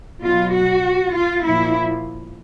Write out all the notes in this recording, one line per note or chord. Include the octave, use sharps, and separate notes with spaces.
B2 F#3 F4
F#4
F4
A#2 F3 E4